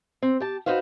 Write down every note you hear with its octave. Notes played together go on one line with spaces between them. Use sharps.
C4
G4 A5
D#4 F#4 B4 C5 F5